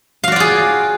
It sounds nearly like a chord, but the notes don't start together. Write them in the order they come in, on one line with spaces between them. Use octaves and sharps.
F5 F#4 D5 F4 G#4